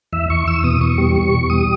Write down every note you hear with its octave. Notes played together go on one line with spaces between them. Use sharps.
E2 E5
E2 C#6
E2 E6
B2 D#6
E2 C#6
G3
B2 C#6
E2
G3 D#6